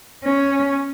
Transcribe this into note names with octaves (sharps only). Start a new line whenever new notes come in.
C#4